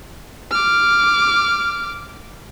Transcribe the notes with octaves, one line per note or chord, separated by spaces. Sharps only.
D6 F6